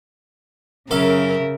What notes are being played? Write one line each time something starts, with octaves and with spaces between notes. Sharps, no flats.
F#2 C#3 A4 A#4 E5 F5